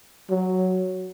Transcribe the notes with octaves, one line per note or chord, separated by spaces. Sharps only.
F#3